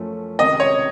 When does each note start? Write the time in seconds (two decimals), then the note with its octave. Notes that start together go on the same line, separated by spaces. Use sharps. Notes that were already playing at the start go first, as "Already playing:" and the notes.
Already playing: F#2 F3 A3 C#4
0.39 C#2 C3 D#3 D#5
0.60 C#5